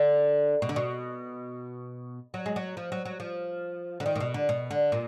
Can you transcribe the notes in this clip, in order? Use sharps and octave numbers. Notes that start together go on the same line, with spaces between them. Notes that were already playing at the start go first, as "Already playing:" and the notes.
Already playing: D3
B2
D3
B2
F#3
G#3
F#3
F3
F#3
F#3
F3
D3
D#3
A#2
B2
D3
B2
D3
A#2